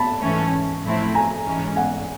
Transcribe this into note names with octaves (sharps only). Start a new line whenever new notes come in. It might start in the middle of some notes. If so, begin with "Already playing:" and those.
Already playing: A5 B5
G#2 E3 A3 C#4
A2 F3 A3 C4 E4
G#5 A#5
G#2 E3 G#3 C#4
F#5 G#5